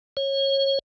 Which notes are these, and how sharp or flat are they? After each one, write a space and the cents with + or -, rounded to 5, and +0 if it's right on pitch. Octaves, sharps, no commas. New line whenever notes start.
C#5 -25